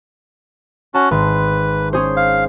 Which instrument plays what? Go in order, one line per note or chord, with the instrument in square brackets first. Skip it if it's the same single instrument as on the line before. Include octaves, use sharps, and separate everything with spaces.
[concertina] C#4 F#4 [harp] A5
[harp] G#1 C6 [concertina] B4
[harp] C#4 G#4 C5
[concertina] F5